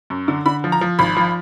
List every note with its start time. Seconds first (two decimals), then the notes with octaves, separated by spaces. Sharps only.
0.10 F#2
0.28 D3
0.46 D3 B5
0.64 F3
0.72 A#5
0.81 F3
0.99 G#1 B5
1.17 F3